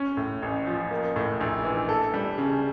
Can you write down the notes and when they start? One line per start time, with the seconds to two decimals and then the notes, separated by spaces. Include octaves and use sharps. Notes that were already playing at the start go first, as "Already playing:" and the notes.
Already playing: C#4
0.17 A2
0.42 A1
0.67 F3
0.91 A#3
1.16 A2
1.41 A#1
1.65 E3
1.89 A4
2.14 G3
2.38 C#3